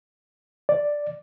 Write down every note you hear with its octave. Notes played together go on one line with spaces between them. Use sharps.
D5